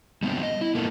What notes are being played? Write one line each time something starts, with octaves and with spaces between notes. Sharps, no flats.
G3 B3 C4 D4
D#5
E4
A#3 B3 F4 A4 A#4